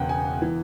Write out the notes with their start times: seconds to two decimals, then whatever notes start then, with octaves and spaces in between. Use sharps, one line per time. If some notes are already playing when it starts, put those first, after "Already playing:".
Already playing: E1 E2 C#3 F#5 G5
0.09 G#5
0.42 E3